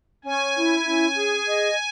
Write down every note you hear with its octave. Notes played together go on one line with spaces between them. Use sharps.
C#4 G#5
E4
C#4
G#4
D#5